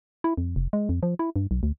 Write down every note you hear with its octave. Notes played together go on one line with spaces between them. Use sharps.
E4
F2
F1
G#3
F2
F3
E4
G2
B1
D2